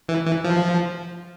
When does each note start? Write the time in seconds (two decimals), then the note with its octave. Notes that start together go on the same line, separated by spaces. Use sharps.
0.09 E3
0.26 E3
0.44 F3